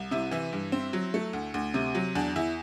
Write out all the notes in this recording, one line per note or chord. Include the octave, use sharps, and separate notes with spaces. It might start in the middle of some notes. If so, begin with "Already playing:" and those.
Already playing: C2
C3 E4
E3 E4
G2
C4
F#3
A3
D2
D2
C3
F#3
E2 D4
E2 E4